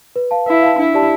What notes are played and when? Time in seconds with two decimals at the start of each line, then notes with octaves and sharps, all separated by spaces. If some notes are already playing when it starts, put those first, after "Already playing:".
0.16 B4
0.31 F5 A5
0.46 E4 B4
0.63 F5 A5
0.78 D4 E4
0.94 G4 D5 A5